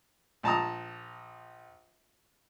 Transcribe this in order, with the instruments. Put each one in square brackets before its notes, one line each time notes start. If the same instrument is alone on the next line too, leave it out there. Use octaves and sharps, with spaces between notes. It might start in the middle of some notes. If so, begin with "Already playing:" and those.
[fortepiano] A#1 A5 A#5 D#6